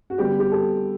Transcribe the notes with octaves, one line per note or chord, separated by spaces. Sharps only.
F#4
D3 G3 B3 G4
G4
A4